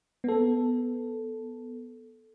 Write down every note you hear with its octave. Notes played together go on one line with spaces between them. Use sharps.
B3 A4